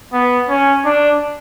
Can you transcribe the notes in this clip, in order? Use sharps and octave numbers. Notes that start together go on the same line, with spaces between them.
B3
C#4
D4